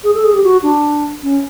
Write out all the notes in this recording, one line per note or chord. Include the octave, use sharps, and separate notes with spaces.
G#4
A4
G#4
G4
F#4
D4
C#4